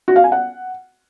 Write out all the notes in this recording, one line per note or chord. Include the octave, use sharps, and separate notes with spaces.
F#4
F5
G#5
F#5